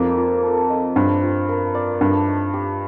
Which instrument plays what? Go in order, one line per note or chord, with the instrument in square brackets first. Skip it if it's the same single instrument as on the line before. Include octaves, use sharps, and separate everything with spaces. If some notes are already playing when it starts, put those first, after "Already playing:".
Already playing: [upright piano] F2 [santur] A#3 D#4
[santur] F4
A4
D#5
[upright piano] G2 [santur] C4
[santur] F4
A#4
D5
[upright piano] G2 [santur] A3
[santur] D#4
G4